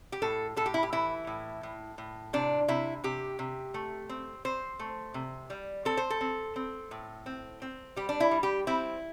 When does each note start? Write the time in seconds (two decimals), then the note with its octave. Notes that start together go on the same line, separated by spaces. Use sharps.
0.12 G4
0.22 A2 A4
0.56 A2 A4
0.66 G4
0.74 E4
0.83 G4
0.93 E3 E4
1.27 A2
1.63 A2
1.98 A2
2.33 C3 D4
2.68 C3 E4
3.04 C3 G4
3.39 C3
3.74 A3
4.09 C4
4.45 C4 C5
4.79 A3
5.14 C3
5.50 G3
5.85 C4 A4
5.97 C5
6.10 A4
6.21 C4
6.56 C4
6.91 A2
7.26 C4
7.62 C4
7.96 G3 G4
8.09 D4
8.20 E4
8.31 G3
8.43 G4
8.67 C4 E4